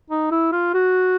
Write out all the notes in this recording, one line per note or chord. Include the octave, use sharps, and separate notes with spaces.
D#4
E4
F4
F#4